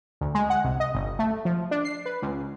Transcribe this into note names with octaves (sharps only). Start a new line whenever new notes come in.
D2
G#3
F#5
C2
D#5
G1
A3
F3
D4
C7
B4
C#2